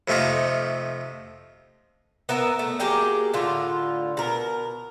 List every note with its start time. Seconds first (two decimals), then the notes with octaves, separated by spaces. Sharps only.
0.08 F2 C3 A3 D#4 F4
2.29 B3 A#4 E5
2.59 A3
2.80 F#3 A#3 G4 G#4
3.34 A2 D3 F4
4.17 B2 A#4